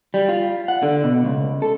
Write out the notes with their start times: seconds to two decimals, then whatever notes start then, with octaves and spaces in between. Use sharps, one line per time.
0.14 G3
0.29 F4
0.68 F#5
0.83 D3
1.04 B2
1.25 C#2
1.62 A4